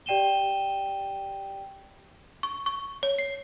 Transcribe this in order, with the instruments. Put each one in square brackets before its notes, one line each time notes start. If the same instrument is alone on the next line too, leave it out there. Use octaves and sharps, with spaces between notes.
[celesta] G4 D5 G5 D#7 E7 G7
[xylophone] C#6
C#6
C#5
C7